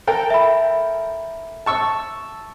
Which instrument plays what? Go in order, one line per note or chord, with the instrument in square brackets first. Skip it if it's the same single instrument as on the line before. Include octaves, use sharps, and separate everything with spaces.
[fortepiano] A4 A#4 G5
[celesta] E5 B5
[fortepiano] A5 C#6 E6